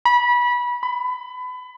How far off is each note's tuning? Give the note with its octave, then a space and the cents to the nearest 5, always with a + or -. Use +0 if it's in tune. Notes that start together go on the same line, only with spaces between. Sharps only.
B5 -25
B5 +25